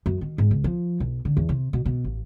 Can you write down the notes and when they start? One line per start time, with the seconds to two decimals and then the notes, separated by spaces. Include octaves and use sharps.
0.06 F#2
0.21 D#3
0.38 G#2
0.51 C#2
0.64 F3
1.00 B1
1.25 D3
1.37 E2
1.49 C3
1.73 B2
1.86 B2
2.04 A1